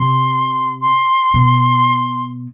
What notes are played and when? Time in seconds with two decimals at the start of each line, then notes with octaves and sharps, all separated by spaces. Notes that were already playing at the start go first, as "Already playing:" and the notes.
Already playing: C3 C6
0.81 C6
1.34 B2